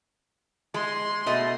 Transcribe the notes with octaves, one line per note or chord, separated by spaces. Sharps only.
G#3 C6
B2 A3 D#5